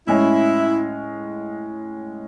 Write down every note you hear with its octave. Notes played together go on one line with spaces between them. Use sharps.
A2 G#3 C#4 E4